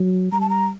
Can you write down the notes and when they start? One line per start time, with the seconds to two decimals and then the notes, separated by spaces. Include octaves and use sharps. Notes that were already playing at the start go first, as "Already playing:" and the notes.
Already playing: F#3
0.32 G3 A#5
0.41 A5
0.50 A#5